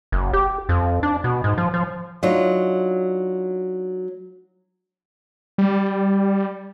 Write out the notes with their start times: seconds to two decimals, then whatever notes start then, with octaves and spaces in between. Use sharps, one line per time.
0.12 F#1
0.33 G4
0.69 F2
1.03 D4
1.24 B2
1.44 G#2
1.58 F3
1.74 F3
2.23 F#3 D4 D#4 F4
5.58 G3